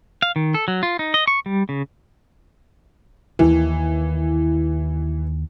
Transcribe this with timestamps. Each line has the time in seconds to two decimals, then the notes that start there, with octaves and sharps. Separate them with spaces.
0.22 F5
0.36 D#3
0.54 A4
0.68 F#3
0.83 F4
0.99 D#4
1.14 D#5
1.28 C#6
1.46 G3
1.69 C#3
3.39 D#2 D#3 E3